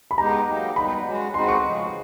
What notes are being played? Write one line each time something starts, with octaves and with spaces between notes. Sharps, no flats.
B5
G#3 B3 D#4 G4 A#5
F#3 A#3 D#4 G4
G3 B3 D#4 B5
G#3 C#4 F#4
G#3 C4 D#4 F#4 B4 C6
C#6
C#3 F3 G#3